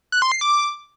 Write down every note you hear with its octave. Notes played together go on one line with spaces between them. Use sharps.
F#6
C6
C7
D6